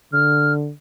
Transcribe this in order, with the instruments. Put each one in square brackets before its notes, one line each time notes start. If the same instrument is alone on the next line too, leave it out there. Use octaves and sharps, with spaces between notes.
[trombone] D3 [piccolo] F6